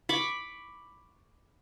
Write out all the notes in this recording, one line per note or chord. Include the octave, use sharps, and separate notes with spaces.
B5 C#6 D6